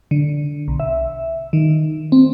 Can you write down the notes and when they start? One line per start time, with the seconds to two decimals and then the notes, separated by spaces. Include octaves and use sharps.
0.11 D3
0.68 B1
0.80 E5
1.53 D#3
2.12 C4